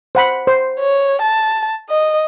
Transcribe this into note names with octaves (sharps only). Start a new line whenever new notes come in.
C5 F#5 B5
C5
C#5
A5
D#5